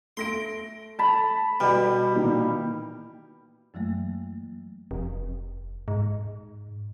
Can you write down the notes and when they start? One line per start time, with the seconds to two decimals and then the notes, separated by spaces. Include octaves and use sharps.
0.17 A3 C6 A#6 D7
0.99 A5 B5
1.60 B2 G3 B5
2.15 A#2 D#3 E3
3.74 F#2 E3 F#3 A3 A#3
4.91 F1
5.88 G#2